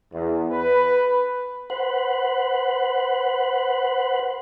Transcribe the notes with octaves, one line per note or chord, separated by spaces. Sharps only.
E2
B4
B4 C5 F#5